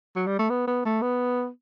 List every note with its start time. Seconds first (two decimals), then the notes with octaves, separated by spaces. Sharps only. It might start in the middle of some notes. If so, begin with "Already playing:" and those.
0.16 F#3
0.27 G3
0.39 A3
0.50 B3
0.67 B3
0.85 A3
1.02 B3